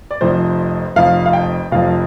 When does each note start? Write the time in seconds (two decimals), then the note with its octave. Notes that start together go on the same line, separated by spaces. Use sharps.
0.11 D5
0.21 F1 F2 F3 C5
0.96 F1 F2 F3 F5
1.26 F5
1.33 G5
1.71 F1 F2 F3 F5